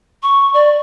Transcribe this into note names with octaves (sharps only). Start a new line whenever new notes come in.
C#6
D5